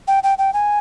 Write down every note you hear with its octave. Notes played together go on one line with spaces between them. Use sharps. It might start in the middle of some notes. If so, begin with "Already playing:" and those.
G5
G5
G5
G#5